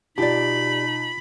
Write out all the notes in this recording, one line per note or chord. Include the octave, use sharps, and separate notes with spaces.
B2 D#4 F4 G4 D5 A5 B5